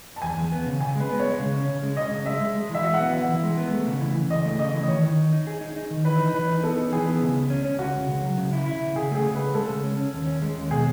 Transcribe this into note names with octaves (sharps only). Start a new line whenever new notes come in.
A5
E2 G#5
E2
B3
C#3
C#3 G#5
G#3
B4
B3
C#5
G#3
C#3
C#4
C#3
G#3
C#4 D#5
C#3
G#3 E5
G#3
G#3
E3 E5
F#4
F#5
B3
E3 F#5
E3
G#3
B3
A3
C#3
E3
E3
C#2 D#5
A3
C#3 D#5
E3
D#5
D#3 C#5
D#3
D#4
D#4
G#4
D#4
D#4
D#3
E3 B4
D#4
E3 B4
D#4
B3 A4
D#4
E3 G#4
B3
C#3
C#2
C#4
C#4
C#2 F#4
C#2
C#2
F#3
C#3
E4
E4
C#3
C#3 G#4
A3 G#4
C#3
A3 B4
G#3 A4
C#3
C#4
C#4
D#2
C#4
G#3
D#2
B2 G#4